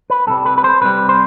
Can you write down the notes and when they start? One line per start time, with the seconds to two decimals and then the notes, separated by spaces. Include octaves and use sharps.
0.10 B4
0.27 C2 C3 G3 A4
0.46 B4
0.58 B4
0.64 C5
0.81 C2 C3 G3 B4
1.09 C5